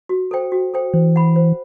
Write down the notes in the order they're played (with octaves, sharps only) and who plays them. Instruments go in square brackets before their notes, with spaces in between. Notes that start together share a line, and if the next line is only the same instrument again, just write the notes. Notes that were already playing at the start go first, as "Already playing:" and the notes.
[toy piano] F#4
A4 C5 G5
F#4
A4 C5 G5
[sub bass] E3 [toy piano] C5
[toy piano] F#5 B5
C5